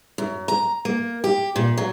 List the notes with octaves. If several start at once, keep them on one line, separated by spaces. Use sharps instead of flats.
F#2
A#5
A#3
G4
A#2
F#3